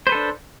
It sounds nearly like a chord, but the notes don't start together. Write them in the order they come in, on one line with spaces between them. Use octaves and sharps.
C5 B4 A4 D4